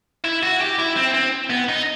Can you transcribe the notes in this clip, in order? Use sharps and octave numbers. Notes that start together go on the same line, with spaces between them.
E4
F#4
G4
E4
C4
C4
B3
D#4